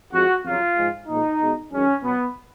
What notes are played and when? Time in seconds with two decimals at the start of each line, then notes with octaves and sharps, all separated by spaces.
0.13 F2 F3 G#3 F#4
0.45 F2 C#3 F#3 F4
0.77 G#2 F3 G#3
1.08 A#2 F3 G#3 D#4
1.40 B2 G#3
1.72 F#2 D#3 G#3 C#4
2.03 B2 F#3 B3